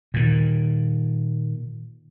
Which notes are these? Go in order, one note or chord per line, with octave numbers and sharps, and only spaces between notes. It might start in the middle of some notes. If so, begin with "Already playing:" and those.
A#2 D#3